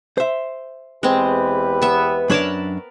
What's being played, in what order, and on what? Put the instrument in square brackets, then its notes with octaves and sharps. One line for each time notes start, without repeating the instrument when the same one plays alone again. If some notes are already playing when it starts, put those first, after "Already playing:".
[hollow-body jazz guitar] C5 E5
[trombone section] E2 G4 B4 [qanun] G#3 C4
[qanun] B3 E5
[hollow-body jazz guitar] F#2 D4 C#5 [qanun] A#4 A5 B5